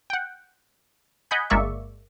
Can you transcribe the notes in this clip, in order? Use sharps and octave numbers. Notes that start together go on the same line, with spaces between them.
F#5 G5
D#5 F#5 G#5 B5 G6
G1 G#3 A#3 D5 E5 C#6